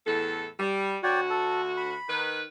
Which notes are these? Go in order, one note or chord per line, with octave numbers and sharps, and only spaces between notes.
E2 A2 A4
G3
D2 F#4 C#5 D5 G5
A4
B5
D#3 B4